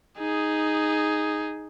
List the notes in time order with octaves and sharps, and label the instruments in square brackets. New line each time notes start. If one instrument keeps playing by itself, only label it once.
[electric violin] D#4 G#4